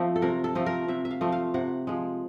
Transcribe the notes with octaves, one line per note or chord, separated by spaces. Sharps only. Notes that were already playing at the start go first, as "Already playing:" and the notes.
Already playing: F3 A3 C4
A4
C3 A#4
A4
F3 A3 C4
A#4
C3 E5
E5
F5
F3 A3 C4
F5
C3 F#5
F3 G#3